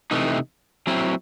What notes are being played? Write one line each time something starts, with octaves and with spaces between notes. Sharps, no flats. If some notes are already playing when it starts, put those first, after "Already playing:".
C3 E3 A3 D#4
F#3 C4 E4